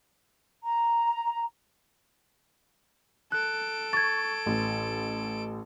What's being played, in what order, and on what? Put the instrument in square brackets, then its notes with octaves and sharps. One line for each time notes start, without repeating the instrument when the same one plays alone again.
[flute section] A#5
[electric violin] A4 D7 [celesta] F#6
[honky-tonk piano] C#6 [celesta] G#6 A6
[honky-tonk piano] A1